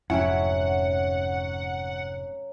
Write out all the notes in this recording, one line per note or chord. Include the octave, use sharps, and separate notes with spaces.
F1 F2 G#2 F#3 C#4 E4 F#5 G5